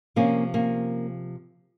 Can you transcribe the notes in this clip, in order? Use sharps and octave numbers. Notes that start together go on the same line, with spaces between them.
C3 F3 A#3 C#4
A#3 C#4